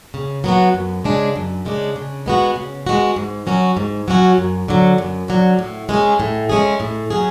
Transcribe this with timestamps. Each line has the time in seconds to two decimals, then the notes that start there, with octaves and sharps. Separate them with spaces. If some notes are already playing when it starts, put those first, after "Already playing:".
0.14 C#3
0.44 F#3 B3 F#4
0.74 F#2
1.04 C#3 G#3 D4 G#4
1.36 F#2
1.66 C#3 G#3 D4 G#4
1.96 C#3
2.26 G#3 B3 F#4
2.56 C#3
2.87 G#3 B3 F#4
3.16 G#2
3.47 F#3 C#4 F#4
3.77 G#2
4.08 F#3 C#4 F#4
4.38 F#2
4.68 D3 F#3
4.98 F#2
5.28 D3 F#3
5.59 A2
5.89 G#3 C#4 G#4
6.20 A2
6.49 G#3 C#4 G#4
6.80 A2
7.10 F#3 C#4 G#4